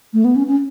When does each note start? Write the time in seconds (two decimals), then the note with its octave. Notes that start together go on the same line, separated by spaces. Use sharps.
0.13 A3
0.25 B3
0.36 C#4
0.47 C#4